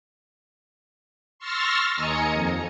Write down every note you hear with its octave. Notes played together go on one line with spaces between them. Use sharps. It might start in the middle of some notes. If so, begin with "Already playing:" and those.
C6 C#6 E6 F6 A6 A#6
D#2 D#5 G#5 A#5 D#6 C#7
F2